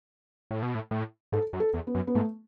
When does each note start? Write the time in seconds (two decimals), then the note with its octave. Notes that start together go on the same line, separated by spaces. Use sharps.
0.51 A2
0.63 B2
0.75 A2
0.91 A2
1.32 G#2 A4
1.53 F#2
1.60 A4
1.74 E2
1.87 B3
1.95 F#2
2.07 B3
2.15 G#2 A3